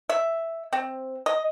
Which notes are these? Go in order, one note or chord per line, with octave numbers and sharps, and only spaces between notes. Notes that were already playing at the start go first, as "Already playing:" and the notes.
E5
C4
D#5